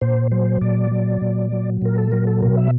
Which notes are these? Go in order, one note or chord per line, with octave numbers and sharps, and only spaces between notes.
A#2 C5
F#3 C5
A#2 D5
F#3
A#2
F#3
A#2 A#4
A4
F#3 A#4
A4
B2 A#4
E5